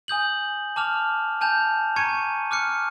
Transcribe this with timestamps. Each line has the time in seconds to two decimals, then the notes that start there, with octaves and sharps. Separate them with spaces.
0.08 G#5 D#6 G6 F#7
0.76 A5 D6 F6 F7
1.41 G#5 A5 G6 F7
1.96 G#5 A#5 C#6 G#6 C#7 D#7
2.51 D6 F6 F#6 C#7